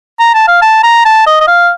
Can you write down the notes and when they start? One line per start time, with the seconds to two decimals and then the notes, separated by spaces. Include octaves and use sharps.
0.19 A#5
0.34 A5
0.48 F5
0.62 A5
0.84 A#5
1.05 A5
1.27 D#5
1.41 D#5
1.48 F5